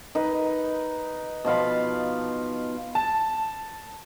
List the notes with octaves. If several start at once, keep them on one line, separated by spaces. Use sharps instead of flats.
D#4 B4
B2 F3 F5 B5
A5